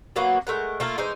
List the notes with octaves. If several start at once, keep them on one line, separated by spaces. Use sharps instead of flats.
F#3 A#3 B3 F#4
G#3 A3 A#4 F#5
A3 A#3 F4 A#4
E3 G#3 D#4 C5